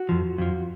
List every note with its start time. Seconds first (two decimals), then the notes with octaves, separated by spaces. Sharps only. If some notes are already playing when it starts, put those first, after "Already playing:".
Already playing: F#4
0.09 F2 F3
0.38 F2 F3